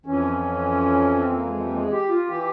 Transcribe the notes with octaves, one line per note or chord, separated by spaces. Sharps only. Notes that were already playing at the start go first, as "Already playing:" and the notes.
F2 E3 C#4
C4
A#3
G#3
G3
A#3
G#3
G4
F4
E3 G4